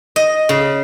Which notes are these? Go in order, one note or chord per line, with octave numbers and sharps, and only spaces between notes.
D#5
C#3